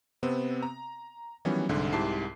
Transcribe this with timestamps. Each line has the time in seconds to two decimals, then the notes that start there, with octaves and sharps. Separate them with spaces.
0.23 C3 B3 C4
0.63 A#5
1.45 D#3 E3 F#3 G3 B3 C#4
1.69 C2 G#2 D3
1.93 C2 G#2 E4 G4 A5 C7